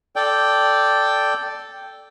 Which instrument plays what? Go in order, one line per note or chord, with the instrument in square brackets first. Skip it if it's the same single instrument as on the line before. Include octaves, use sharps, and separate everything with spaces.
[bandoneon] A4 D5 G5